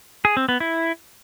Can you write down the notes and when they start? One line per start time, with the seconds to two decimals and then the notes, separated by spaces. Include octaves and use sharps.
0.25 G#4
0.37 C4
0.49 B3
0.60 E4